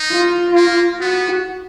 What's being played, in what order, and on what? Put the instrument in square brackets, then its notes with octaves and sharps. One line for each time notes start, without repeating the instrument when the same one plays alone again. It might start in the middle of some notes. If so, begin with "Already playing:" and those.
Already playing: [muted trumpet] D#4
[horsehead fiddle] F4
[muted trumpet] A#3
[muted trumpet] B3 [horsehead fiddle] F#4